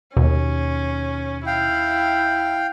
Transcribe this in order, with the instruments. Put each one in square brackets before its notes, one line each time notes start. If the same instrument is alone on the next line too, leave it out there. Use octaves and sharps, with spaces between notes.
[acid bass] D#2 [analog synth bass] B2 [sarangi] C#4
[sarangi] E4 [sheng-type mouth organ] F5 G5